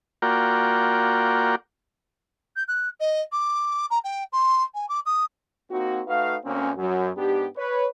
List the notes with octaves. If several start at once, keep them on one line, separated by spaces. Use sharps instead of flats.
A#3 F4 F#4 A#4 D5 G5
G6
F#6
D#5
D6
A#5
G5
C6
G#5
D6
D#6
A#3 C4 D#4 F#4
A3 D#4 F#4 B4 F5
D2 A#3 C4 C#4
F#2 F#3
G#2 B3 D4 G4
B4 C#5